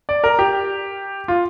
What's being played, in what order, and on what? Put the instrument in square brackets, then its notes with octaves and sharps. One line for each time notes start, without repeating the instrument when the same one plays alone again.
[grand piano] D5
A#4
G4
F4